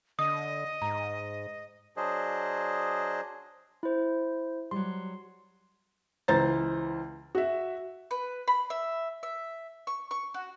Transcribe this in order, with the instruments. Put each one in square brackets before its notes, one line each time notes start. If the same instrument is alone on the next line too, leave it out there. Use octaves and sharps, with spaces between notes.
[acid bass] D3 [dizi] D#5 [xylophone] D#6
[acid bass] G#2 [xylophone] A#5
[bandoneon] F#3 D4 G#4 C5 D#5
[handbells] E4 C5
[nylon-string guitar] F#3 G3 [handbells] C6
[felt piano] C#2 E3 C5 A#5 A6
F#4 E5
[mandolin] B4
B5
E5
E5
C#6
C#6
F#4